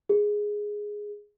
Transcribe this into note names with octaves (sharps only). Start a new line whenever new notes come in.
G#4